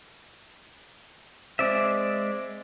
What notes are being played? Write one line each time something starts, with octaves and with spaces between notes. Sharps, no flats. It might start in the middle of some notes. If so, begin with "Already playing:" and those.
G#3 C4 D5 E5